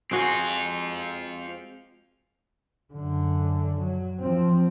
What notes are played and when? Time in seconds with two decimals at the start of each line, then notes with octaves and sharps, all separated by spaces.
0.11 G#3 C4 F4 F#4
2.93 F#2 D3
3.81 F#3
4.19 F3 C4